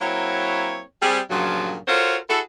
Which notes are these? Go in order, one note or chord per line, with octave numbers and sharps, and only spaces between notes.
F#3 A#3 C4 E4 C#5
G3 C4 G#4
G2 A#2 C#3 F3 F#3
F4 F#4 A4 A#4 C5 C#5
E4 F#4 G#4 A4